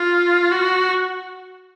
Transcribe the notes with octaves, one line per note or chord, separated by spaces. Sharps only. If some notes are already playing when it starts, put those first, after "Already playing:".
Already playing: F4
F#4